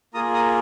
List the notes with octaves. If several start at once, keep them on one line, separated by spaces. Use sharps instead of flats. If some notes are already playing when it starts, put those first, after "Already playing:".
A#3 F4 G#4 A#5 D#6
A#5 D#6